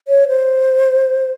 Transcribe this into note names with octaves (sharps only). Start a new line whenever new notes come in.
C#5
C5